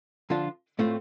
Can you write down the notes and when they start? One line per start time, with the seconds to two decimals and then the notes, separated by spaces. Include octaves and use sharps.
0.30 D3 F3 D4 F4
0.79 A2 A3 C4 F4